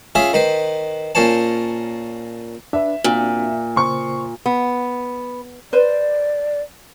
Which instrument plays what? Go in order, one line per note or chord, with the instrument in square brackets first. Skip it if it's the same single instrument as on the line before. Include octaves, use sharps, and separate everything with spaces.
[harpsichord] C#4 F4 G#4 E5
D#3 B4 C5
A#2 C#4 C5 C#5 A5
[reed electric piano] D4 B4 [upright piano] E5
[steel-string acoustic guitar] A#2 [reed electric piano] C4 D4 F#4
[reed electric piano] C#3 A#3 C5 [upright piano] C6 C#6
[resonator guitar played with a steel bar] B3
[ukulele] B4 C5 [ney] D5